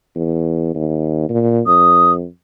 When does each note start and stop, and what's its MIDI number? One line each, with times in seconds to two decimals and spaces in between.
0.16 0.73 40
0.75 1.26 39
1.29 1.61 46
1.67 2.25 41
1.67 2.12 87